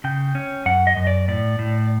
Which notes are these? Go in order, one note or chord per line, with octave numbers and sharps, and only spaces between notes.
C#3 G5
C#4
F#2 F#5
D#5
F#2
D5
A2 D5
A2